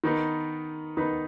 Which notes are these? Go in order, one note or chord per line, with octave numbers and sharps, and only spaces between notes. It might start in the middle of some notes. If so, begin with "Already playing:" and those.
D#3 B3 D#4 B4
D#3 B3 D#4 B4